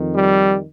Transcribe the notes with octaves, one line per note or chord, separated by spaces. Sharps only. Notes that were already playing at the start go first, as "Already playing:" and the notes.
Already playing: F2 D#3
G3